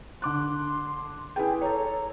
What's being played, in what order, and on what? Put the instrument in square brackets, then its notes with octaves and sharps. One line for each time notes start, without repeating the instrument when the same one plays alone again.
[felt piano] D3 D6 F#6 [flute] C6
[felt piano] E4 B4 G5 [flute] G#4
[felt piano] A4 C#5 [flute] A#5